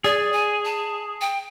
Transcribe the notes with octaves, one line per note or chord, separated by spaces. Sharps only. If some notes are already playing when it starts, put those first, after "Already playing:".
G#4 D5
G#5
A5
G5